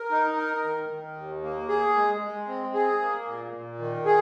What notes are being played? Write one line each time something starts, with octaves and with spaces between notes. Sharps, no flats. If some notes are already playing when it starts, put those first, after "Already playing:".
Already playing: A#4
D#4
A#4
D#3
D#3
D#2
A#3
G#4
G#3
G#3
C4
G#4
A#3
A#2
A#2
D#3
G#4